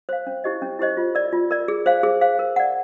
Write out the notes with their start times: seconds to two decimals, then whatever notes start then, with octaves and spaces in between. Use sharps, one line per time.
0.09 C5 F5
0.27 C#4
0.44 E4 G4 C5 D#5
0.62 C#4
0.79 E4 G4 C5 D#5
0.97 F4
1.15 A#4 D5
1.33 F4
1.51 A#4 D5
1.68 G#4
1.86 C5 F5
2.03 G#4
2.21 C5 F5
2.39 A#4
2.56 D5 F#5